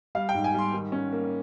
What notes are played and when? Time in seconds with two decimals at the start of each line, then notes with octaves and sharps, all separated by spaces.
0.15 G3 F5
0.29 G5
0.34 G#2
0.44 G#5
0.54 G3 C6
0.73 D#3
0.92 C#4
1.12 A#3